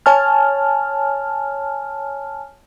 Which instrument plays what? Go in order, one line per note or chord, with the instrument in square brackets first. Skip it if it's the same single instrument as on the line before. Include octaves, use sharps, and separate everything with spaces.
[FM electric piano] C#5 G#5 A5 F6